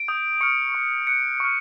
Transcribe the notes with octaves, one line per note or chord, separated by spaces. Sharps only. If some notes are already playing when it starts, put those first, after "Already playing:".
Already playing: D7
D#6 G6
C#6 F6 C#7
C#6 F#6
D#6 F#6 C#7
C#6 F6